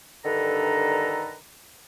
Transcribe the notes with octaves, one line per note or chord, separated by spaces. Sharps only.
G2 D3 D#3 A4 B4 A#5